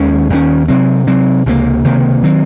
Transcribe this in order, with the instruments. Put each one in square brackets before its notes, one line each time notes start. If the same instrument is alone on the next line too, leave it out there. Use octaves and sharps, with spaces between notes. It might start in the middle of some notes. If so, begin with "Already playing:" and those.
Already playing: [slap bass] D#2 D#3 G#3 C#4
D#2 D#3 G#3 C#4
C3 F#3 C4
C3 F#3 C4
C#2 C3 D#3 A#3
C#2 C3 D#3 A#3
D#3 F#3 C4